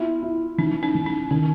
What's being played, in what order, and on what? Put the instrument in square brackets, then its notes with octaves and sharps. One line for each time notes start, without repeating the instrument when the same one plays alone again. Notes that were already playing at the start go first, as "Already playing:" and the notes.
Already playing: [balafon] B3 [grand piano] E4 F4
[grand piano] E4
[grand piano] E3 [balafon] C#4 D#4
[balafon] C#4 D#4
[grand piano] E3
[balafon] C#4 D#4
[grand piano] D#3 [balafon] C#4